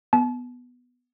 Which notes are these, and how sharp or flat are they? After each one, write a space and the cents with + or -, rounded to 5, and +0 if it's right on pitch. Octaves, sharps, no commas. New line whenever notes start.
B3 +0 A5 -35